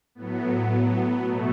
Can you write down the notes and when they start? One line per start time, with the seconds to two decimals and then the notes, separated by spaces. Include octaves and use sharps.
0.15 A2 B3
0.20 F#3
1.20 B2 F#3 A3